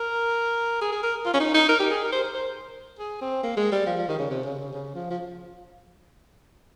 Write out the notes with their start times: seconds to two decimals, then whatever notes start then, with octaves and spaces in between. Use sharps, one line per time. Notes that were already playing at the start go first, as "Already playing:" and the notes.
Already playing: A#4
0.81 G#4
0.92 G#4
1.03 A#4
1.25 F4
1.34 C#4
1.40 D#4
1.54 D#4
1.69 A#4
1.80 G4
1.90 G#4
2.04 A#4
2.13 C5
2.23 A#4
2.34 C5
2.99 G#4
3.21 C4
3.43 A#3
3.57 G#3
3.72 G3
3.86 F3
3.97 F3
4.08 D#3
4.19 C#3
4.30 C3
4.44 C#3
4.59 C#3
4.73 C#3
4.95 F3
5.10 F3